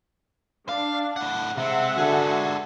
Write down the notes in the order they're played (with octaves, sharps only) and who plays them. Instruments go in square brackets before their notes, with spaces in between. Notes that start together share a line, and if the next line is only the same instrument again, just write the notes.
[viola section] D4 [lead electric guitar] F5
[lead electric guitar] A2 F#5
[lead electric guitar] C3 C4 [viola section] G#3 E5 F#5
[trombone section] D3 F#4 [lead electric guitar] G#4 A4